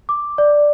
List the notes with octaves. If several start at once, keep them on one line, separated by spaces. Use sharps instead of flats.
D6
D5